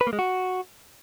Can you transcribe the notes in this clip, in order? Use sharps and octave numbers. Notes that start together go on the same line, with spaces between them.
B4
A#3
G#3
F#4